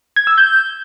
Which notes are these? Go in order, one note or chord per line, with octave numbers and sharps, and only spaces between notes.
G#6
E6
G6